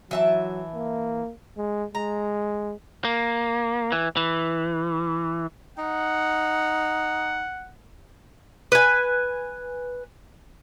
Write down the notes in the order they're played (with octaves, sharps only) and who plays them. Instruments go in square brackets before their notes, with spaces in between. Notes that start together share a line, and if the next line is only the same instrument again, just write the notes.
[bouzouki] E3 E5 A5 [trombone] F#3
[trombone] A#3
G#3
[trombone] G#3 [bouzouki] A#5
[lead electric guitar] A#3
E3
E3
[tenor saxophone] D#4 [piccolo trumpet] F#5
[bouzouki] B4 G#5